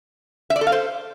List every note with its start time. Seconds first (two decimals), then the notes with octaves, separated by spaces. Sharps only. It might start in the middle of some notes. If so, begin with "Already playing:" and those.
0.50 E5
0.56 D5
0.61 A4
0.67 F5
0.72 C5